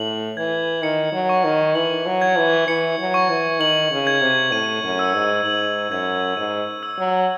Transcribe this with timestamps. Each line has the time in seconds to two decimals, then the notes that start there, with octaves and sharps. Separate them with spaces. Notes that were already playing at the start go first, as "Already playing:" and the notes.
Already playing: A2 F#7
0.37 E3 G#6
0.82 D#3 C#7
1.13 F#3
1.29 C#6
1.44 D#3
1.75 E3 F#7
2.06 F#3
2.22 G#6
2.37 E3
2.68 E3 C#7
2.99 F#3
3.14 C#6
3.30 E3
3.59 D#3 F#7
3.91 C#3
4.07 G#6
4.22 C3
4.52 A2 D#7
4.84 F#2
4.99 E6
5.15 G#2
5.45 G#2 F#7
5.91 F#2 G#6
6.37 G#2 D#7
6.83 E6
6.98 F#3